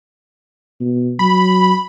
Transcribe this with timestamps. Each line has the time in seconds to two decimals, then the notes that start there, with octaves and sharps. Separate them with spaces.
0.81 B2
1.19 F#3 B5